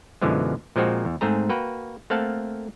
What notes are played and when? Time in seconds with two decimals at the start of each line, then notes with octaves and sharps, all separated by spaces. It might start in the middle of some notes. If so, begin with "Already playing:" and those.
0.22 F#2 B2 D3 E3 F3 G#3
0.76 A#2 F3 G#3 C4 F#4
1.05 E2
1.21 G#2 A3 C4 G#4 A#5
1.49 A#3 F#4 B4 G5
2.10 A3 A#3 C4 F5 F#5 A5